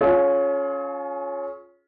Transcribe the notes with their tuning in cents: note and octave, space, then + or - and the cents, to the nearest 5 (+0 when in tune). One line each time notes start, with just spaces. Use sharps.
C#4 +0 F4 +15 G#4 +40